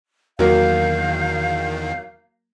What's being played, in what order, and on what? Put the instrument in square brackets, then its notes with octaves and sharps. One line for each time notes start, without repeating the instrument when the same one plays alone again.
[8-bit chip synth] E2 D#3 [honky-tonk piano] F#3 A#3 [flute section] F5 G6